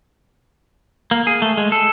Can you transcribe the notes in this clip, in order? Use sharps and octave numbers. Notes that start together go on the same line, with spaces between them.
A#3
G#4
A3
G#3
A4